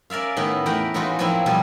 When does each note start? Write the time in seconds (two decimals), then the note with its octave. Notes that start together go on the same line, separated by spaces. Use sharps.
0.10 C#4 A#4 D5 E5 F5
0.36 A2 D#3 B3 E4
0.66 E2 A3 A#4 B4 F#5 G5
0.94 A2 E3 G#3 D#4 F4 F#4
1.19 F3 F#3 A#3 C4 E4
1.46 B2 F3 G3